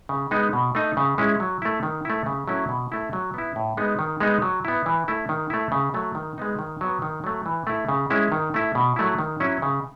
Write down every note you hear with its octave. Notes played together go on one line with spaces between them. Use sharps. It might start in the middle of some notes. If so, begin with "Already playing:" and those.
C#3
G#3 B3 D#4
B2
A3 D#4
C#3
G#3 C#4 E4
F#3
A3 E4
D#3
A3 E4
C#3
F#3 A3 C#4 E4
B2
A3 E4
F#3
B3 E4
A2
G#3 B3 D#4
D#3
G#3 B3 D#4
F#3
B3 E4
E3
A3 E4
D#3
A3 E4
C#3
F#3 A3
D#3
G#3 B3 D#4
D#3
F#3 B3
D#3
F#3 A3
E3
A3 E4
C#3
G#3 C#4 E4
D#3
A3 E4
B2
F#3 A3 E4
D#3
F#3 C#4 E4
C#3